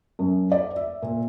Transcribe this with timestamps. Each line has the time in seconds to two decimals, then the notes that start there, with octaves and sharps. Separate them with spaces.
0.19 F#2
0.52 D5
0.76 E5
1.02 A#2